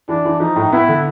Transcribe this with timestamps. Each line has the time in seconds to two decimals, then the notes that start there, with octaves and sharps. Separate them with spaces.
0.09 E3 D4
0.25 E3
0.40 F3 D#4
0.56 A2
0.72 B3 E4
0.88 D3